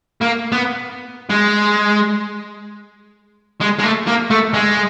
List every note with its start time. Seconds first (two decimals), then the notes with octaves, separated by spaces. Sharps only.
0.21 A#3
0.52 B3
1.29 G#3
3.61 G#3
3.79 G#3
3.84 A3
4.07 A#3
4.30 A3
4.54 G#3